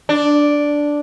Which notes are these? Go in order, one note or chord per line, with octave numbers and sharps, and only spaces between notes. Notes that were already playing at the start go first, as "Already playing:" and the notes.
D4